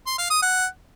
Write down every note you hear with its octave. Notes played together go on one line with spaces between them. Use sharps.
C6
F5
D#6
F#5